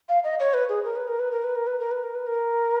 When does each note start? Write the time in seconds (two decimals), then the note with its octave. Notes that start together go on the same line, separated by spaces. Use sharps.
0.09 F5
0.24 D#5
0.40 C#5
0.54 B4
0.69 G#4
0.84 A#4
0.96 B4
1.08 A#4
1.19 B4
1.32 A#4
1.44 B4
1.56 A#4
1.67 B4
1.80 A#4
1.91 B4
2.03 A#4
2.15 B4
2.27 A#4